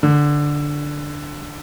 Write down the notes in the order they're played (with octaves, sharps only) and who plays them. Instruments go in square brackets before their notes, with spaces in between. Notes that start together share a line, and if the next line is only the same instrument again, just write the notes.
[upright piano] D3